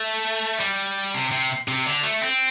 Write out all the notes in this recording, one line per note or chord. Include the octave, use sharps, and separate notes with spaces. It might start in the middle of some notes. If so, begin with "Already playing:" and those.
Already playing: A3
G3
C3
C3
C3
D3
A3
C4